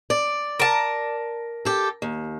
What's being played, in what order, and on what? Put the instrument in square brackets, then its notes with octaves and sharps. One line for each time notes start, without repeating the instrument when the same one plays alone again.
[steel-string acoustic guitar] D5
[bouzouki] A#4 A5
[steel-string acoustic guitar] G4 A4
D#2